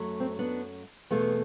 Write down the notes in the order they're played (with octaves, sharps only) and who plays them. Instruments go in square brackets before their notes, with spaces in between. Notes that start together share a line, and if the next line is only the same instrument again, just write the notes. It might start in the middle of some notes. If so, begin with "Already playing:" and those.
Already playing: [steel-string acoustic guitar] F#2 F#3 A3
C4
B3 D4
E2 B2 A3 B3